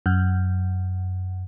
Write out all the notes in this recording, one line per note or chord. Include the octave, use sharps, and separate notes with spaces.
F#2